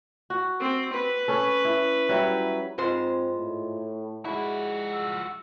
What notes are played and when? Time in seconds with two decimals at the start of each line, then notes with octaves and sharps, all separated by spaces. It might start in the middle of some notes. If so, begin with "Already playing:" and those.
0.30 F#4
0.60 C4
0.93 B4
1.28 C#4 A4
1.65 E4
2.09 F#3 G3 E4
2.78 G#2 G#3 C4 F4 C5 D#5
3.34 A2
4.25 F3 G#3 E4 F#4 D5
4.93 E6